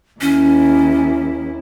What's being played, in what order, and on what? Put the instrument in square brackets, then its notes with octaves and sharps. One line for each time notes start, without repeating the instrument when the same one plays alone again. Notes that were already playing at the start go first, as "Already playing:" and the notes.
[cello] D#2 E4 [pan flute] C#4